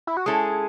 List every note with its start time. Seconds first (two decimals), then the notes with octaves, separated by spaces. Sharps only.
0.07 E4
0.17 F#4
0.26 G#3 C#4 E4 G#4 A4